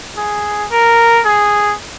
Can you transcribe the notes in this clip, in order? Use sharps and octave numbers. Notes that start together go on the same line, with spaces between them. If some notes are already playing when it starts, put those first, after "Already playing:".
G#4
A#4
G#4